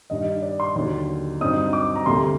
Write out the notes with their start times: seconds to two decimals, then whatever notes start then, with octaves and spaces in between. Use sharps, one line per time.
0.10 G2 D#3 G3 D#5
0.42 D5
0.60 C6
0.76 D#2 D3 F#3
1.41 G2 F#3 C4 D#4 D#6
1.73 D6
1.95 A#5
2.06 D2 C3 G3 A#3 C6